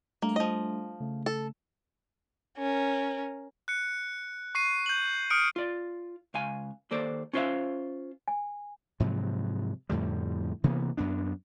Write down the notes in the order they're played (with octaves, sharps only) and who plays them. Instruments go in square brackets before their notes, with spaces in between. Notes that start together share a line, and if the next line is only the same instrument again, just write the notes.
[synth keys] G3 A3 D4 [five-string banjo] A#3
[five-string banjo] F3 D#5
[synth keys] C#3 A3
[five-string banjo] A4
[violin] C#4 A#4
[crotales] F#6 C#7
C#6 C7 D#7
G6 F#7
D#6 F6 C#7 D7
[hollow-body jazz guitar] F4 D5
C#2 F5 G#5
D#2 A#3 A4 C5 D5
C#4 F4 C5 C#5 E5 F5
[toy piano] G#5
[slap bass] G#2 C3 F3 F#3
F2 A2 D3 G3
C3 E3 A#3 B3
F#2 B3 D4